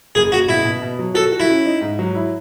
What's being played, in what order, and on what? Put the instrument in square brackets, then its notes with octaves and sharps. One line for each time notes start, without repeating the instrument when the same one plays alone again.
[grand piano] F#1 [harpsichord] G#4
[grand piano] F#1 [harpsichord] F#4
[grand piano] B2 [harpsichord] E4
[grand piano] B2
B2
F#3
[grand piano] F#4 [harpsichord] A4
[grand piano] F#4
[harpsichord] E4
[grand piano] C#4
D#4
G#2
F#3
E4